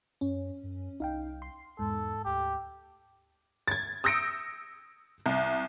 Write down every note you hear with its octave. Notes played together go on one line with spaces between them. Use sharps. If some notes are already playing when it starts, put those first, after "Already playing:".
F#2 C#4
F#2
C2 D#4 F5 G5
C6
E2 G#2 A4
D2 G4
G#6 A6
D#6 E6 G6 A#6 C#7 D7
C2